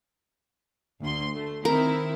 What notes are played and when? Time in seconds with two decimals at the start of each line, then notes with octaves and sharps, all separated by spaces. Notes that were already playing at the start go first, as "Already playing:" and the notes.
1.01 D2 C6
1.36 A3
1.65 D#3 C4 E4 A#4